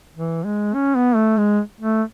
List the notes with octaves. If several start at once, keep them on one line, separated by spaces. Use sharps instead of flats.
E3
G#3
C#4
B3
A3
G#3
A3